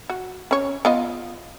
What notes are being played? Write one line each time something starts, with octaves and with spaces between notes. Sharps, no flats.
F#4
C#4 C#5
B3 F4 D#5